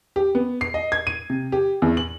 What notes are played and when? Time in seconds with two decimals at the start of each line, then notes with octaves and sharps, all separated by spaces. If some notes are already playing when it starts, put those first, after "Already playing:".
0.16 G4
0.35 B3
0.61 C7
0.74 D#5
0.92 G#6
1.07 D#7
1.30 C3
1.52 G4
1.82 E2
1.97 F#7